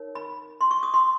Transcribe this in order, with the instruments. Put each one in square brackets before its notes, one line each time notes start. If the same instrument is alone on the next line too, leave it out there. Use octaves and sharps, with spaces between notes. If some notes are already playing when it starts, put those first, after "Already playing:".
Already playing: [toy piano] D#4 A#4 C#5
B5
C6
C#6
D#6
C6